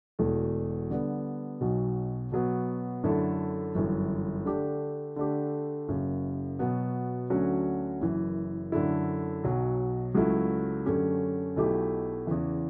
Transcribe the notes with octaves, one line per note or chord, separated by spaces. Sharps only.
E1 E2 B2 A3
D3 G3 B3
B1 B2 F#3
B2 F#3 B3
F#2 D3 A3 E4 A4
G1 F#2 E3
D3 A3 D4 G4
D3 A3 D4 G4
F#1 F#2 C#3
B2 F#3 B3
D2 D3 F#3 C#4 F#4
F#1 F#2 E3
F#2 D3 A3 E4
B1 B2 F#3
C#2 C#3 F#3 A3 E4
F#2 D3 A3 C#4 G4
B1 B2 A3 E4 G4
E2 C#3 E3